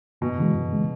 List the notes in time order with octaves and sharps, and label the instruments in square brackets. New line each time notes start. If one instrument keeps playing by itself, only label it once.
[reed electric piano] F#2 [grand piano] B2
[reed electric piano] C#3 E3 G#3
F#2
C#3 E3 G#3